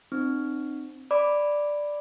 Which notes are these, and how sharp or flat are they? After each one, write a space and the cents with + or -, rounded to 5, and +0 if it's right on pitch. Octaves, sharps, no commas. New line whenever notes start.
C4 +5 D#4 -40
D5 +0 B5 +0 D6 +0